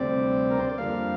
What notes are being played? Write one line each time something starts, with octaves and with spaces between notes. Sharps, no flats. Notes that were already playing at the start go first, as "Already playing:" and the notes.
Already playing: D2 C3 G3 C4 D5
A#4
C5
D5
F2 D3 G3 A#3 F5